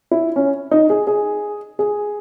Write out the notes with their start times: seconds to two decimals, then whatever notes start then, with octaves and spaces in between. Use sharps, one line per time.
0.11 E4
0.36 C#4
0.71 D#4
0.90 G#4
1.07 G#4
1.79 G#4